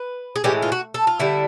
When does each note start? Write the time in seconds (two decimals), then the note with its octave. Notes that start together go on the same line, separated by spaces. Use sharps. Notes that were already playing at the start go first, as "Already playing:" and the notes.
Already playing: B4
0.36 G#4
0.44 A2 E3 G#3 G4
0.62 F4
0.72 F#4
0.94 A4
1.07 F4
1.19 D3 G3 E4